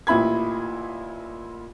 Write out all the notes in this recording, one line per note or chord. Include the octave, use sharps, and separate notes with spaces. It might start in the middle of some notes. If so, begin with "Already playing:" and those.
A1 A#2 E4 B5 G#6